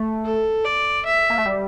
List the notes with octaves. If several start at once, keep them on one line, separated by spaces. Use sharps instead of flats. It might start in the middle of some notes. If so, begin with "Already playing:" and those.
Already playing: A3
A4
D5
E5
A#3
A3
G3